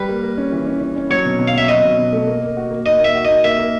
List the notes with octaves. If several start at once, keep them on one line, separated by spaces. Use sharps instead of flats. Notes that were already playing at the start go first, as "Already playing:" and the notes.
Already playing: G3 B4
A#3
A#3
C#4
E3
C#4
C#4
C#4
F#3 C#5
B2
B2
F5
F#3 E5
F#3 D#5
B2
B2
A3
A#3
A#3
F#4
A#3
D#4 D#5
A#3 E5
F#4
D#4 D#5
A#3 E5
A#3